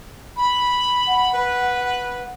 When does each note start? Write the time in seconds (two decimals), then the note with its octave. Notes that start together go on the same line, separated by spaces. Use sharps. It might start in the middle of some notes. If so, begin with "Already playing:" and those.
0.37 B5
1.07 F#5
1.33 B4